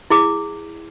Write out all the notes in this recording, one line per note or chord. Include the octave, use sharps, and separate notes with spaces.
E4 G#4 D6